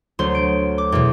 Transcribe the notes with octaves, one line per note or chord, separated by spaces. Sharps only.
D2 F#3 C5 C6
D7
D6
E2 B2